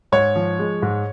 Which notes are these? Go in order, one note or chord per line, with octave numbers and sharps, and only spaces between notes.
G#2 C#5
F3
G#3
G#2